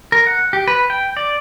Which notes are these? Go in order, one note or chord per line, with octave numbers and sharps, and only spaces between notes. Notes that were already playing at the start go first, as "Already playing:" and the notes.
A#4
F#5
G4
B4
G5
D5